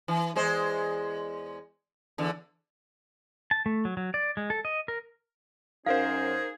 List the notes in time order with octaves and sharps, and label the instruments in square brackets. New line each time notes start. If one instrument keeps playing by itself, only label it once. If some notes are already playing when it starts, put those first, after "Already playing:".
[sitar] E3
E2 G#3 C5
E2 D3
[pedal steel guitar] A5
A3
F#3
F#3
D5
G#3
A4
D#5
A#4
[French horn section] F#2 C#4 [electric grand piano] D#4 A#4 C5 [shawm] G#4 [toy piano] F5